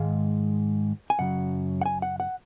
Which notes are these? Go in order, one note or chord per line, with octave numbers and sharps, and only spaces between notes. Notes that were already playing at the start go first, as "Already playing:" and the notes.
Already playing: G#2 D#3 G#3 F5
G#5
F#2 C#3 F#3 F#5
F#5
G#5
F#5
F#5